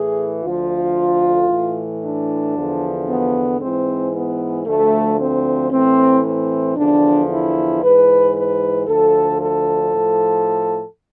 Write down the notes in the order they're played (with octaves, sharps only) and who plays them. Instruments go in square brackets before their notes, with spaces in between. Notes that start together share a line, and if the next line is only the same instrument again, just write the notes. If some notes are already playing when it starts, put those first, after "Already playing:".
Already playing: [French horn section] A2 E3 G#4
D2 D3 F3 F4
A2 E3
D4
E2 D3 F3
B3
G#2 E3 C4
B3
D2 D3 F3 A3
C4
A2 E3 C4
C4
E2 D3 F3 D4
E4
G#2 E3 B4
B4
D2 D3 F3 A4
A4
A2 F3